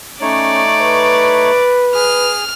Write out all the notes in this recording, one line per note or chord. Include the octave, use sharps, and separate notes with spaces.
A3 C#4 D#4 C#5 D5
B4
G#4 D#6 F6